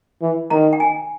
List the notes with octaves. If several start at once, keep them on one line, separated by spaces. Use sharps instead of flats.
E3
D#3 A#5
G5
G#5